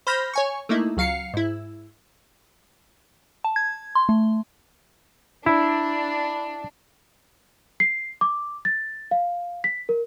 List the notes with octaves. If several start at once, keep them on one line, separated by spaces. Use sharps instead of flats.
C5 B5 F6 G6 A#6
C#5 G#5 C#6
A3 A#3 D#4 E4
C#2 F#3 F5 C7 C#7
G#2 E4
A5
G#6
C6
A3
D4 E4 B5
C7
D6
A6
F5
B6
A#4